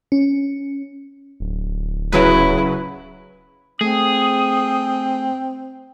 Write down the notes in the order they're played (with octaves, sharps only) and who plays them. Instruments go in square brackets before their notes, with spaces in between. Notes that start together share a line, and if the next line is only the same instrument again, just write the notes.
[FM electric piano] C#4
[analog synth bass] D1
[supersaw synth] C#3 F#3 B4 [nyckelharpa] E4
[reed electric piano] A3 [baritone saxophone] C4 [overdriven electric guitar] G#4 [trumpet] D#6